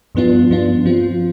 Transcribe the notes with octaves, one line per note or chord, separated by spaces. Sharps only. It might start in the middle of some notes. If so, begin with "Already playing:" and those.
G2 F3 B3 D4 F4
G2 F3 B3 D4 F4
F3 C4 F4